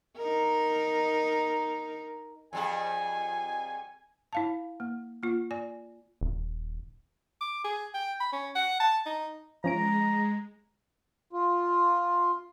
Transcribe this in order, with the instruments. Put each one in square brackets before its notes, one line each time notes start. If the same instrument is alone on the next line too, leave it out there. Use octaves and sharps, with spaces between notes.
[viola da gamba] D#4 A#4
[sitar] F2 G3 G#4 [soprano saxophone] G#5
[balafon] E4 F5 A5
A#3
A#3 F4
D5 G#5
[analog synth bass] D#1
[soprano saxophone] D6
G#4
G5
B5
C#4
F#5
A5
D#4
[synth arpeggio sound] F3 C#4 D7 [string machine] G#3 [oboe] A#5
[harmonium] F4